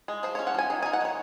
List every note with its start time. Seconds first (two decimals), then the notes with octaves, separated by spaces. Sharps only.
0.08 G#3
0.23 F3 C5
0.35 C#5
0.39 C#4
0.47 F#5
0.54 F3 G#5
0.70 D#3 F5
0.82 G#5
0.86 D#4
0.93 F#5
1.01 D#3 C#5